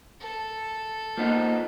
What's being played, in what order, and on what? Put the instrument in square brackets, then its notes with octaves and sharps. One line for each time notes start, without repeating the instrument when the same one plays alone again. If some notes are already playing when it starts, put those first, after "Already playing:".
[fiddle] A4
[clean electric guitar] F3 B3 D#4 [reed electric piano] A#3